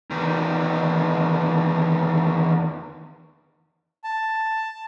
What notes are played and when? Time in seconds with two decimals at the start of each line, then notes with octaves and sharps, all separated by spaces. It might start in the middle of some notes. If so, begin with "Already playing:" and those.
0.11 E2 D#3
4.04 A5